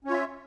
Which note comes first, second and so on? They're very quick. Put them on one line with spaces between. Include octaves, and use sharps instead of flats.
C#4 C#5 F4 E5